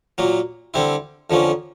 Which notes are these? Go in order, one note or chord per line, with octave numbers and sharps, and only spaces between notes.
A#2 F#3 A#3
D3 G3 C4 E4
F2 D3 F3 A#3 C#4